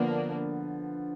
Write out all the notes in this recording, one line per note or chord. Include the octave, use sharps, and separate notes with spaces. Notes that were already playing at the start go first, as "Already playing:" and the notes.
Already playing: D3 F3 A#3 B3 D4